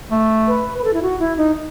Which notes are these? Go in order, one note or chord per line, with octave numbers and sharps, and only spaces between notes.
A3
B4
B4
A4
E4
F#4
E4
D#4